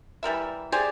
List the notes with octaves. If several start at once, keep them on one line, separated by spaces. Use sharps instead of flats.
E3 G3 A#4 E5
G4 G#4 C5 D5